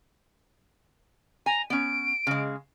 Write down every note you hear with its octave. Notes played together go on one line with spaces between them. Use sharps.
G#5 A#5
B3 C#4 D7
C#3 G#3